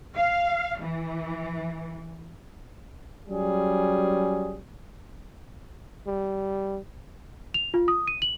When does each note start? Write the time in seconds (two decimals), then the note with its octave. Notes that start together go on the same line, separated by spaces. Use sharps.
0.16 F5
0.82 E3
3.28 F#3 G3 C#4 G#4
6.07 G3
7.54 F7
7.74 F4
7.88 D#6
8.08 D#7
8.22 F#7